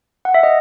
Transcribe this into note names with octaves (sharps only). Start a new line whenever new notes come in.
F#5
E5
D#5